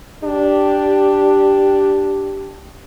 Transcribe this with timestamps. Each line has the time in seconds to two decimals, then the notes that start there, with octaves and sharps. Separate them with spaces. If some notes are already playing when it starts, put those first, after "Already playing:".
0.24 D4 G4